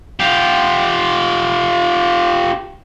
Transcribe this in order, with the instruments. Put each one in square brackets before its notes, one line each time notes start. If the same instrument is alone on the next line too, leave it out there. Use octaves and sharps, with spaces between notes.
[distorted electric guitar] F4 G4